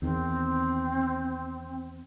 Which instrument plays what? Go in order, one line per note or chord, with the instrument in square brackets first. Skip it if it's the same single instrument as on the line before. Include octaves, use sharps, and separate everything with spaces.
[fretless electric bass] E2 D#3 [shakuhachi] C4